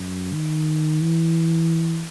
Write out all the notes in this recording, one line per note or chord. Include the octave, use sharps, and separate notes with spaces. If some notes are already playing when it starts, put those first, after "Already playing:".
Already playing: F#2
D#3
E3